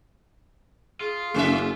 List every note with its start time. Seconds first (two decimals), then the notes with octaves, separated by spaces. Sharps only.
1.01 F4 G#4
1.34 F#1 A3 C#4 G#4 E5